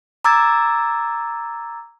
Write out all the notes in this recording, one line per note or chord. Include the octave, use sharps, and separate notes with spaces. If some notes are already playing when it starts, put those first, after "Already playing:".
A#5 D6 E6 G#6 A6